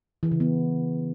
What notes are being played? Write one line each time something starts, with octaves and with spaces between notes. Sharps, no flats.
E3
C#3
B3